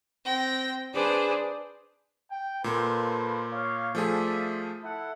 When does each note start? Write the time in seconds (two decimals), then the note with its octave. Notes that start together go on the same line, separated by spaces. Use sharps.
0.24 C4 G5 A#6
0.94 D4 G#4 B4 C5 D5
2.31 G5
2.64 A#2 A#3 A4 B4 C5
3.51 C#5 F5
3.95 F3 A3 F4 G#4 D5 E5
4.83 E4 A4 F#5